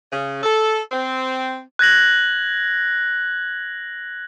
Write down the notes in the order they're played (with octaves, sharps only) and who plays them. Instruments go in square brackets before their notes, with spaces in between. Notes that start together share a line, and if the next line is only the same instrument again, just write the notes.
[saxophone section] C#3
A4
C4
[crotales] F#6 G#6 A#6 F#7